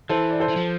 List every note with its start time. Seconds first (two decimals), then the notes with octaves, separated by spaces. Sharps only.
0.09 E3 A4 C5
0.30 D5
0.40 A4 C5
0.48 E3
0.56 F3